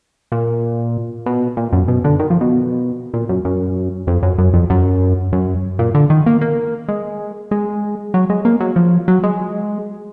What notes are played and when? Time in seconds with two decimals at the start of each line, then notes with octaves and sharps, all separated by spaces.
0.32 A#2
1.26 B2
1.57 A#2
1.73 F#2
1.88 B2
2.04 D3
2.19 D#3
2.30 F3
2.41 B2
3.14 A#2
3.29 F#2
3.45 F#2
4.07 F2
4.23 F#2
4.38 F#2
4.54 F2
4.70 F#2
5.33 F#2
5.79 A#2
5.95 D3
6.10 D#3
6.26 A#3
6.41 A#3
6.88 G#3
7.51 G#3
8.14 F#3
8.30 G#3
8.45 A#3
8.60 F#3
8.76 F3
9.08 F#3
9.23 G#3